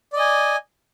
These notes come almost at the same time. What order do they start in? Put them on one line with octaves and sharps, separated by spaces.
D5 D#5 G#5